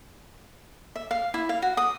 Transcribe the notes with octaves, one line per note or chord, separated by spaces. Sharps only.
E5
F5
E4
F5
F#4
D#6